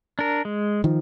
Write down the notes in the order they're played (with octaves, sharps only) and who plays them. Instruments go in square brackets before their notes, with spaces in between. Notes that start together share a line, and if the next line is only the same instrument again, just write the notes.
[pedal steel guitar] D4 A#4
G#3
[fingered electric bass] D#3 F3